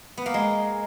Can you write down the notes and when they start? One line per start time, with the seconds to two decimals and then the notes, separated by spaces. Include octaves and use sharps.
0.17 B3
0.26 A#3
0.34 G#3